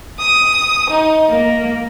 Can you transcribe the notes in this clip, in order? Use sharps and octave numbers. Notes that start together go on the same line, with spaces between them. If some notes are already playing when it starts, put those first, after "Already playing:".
D#6
D#4
A#3